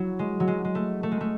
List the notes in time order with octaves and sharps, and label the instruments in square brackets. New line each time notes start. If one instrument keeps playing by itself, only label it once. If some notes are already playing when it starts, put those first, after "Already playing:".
Already playing: [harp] F#3 E4 F#4
G#3
F#3
G#3
G#3
A3
A3
G#3
A3